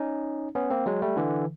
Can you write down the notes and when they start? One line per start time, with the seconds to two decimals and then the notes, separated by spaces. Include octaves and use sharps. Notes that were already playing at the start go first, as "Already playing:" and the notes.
Already playing: C#4 D#4
0.55 B3 C#4
0.70 A#3 C4
0.86 F#3 G#3
1.02 G3 A3
1.17 D3 E3